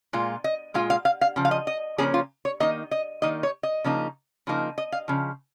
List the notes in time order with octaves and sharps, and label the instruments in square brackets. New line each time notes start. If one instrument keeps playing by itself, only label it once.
[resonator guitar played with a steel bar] A#2 G#3 F4
D#5
A#2 G#3 F4 F5
F5
F5
F5
C#3 F3
F5
D#5
D#5
C#3 F3 A#3 C#4 G#4
F4
C#5
D#3 A#3 D#4 D#5
D#5
D#3 A#3 D#4 D#5
C#5
D#5
C#3 F3 A#3 D#4
C#3 F3 A#3 D#4
D#5
F5
C#3 F3